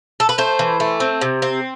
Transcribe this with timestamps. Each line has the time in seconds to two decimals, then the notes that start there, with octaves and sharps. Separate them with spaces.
0.20 A4
0.29 B4
0.38 A3 C5
0.59 E3
0.80 A3
1.00 C4
1.21 C3
1.42 C4